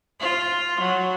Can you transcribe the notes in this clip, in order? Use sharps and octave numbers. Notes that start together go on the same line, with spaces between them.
F4
F#3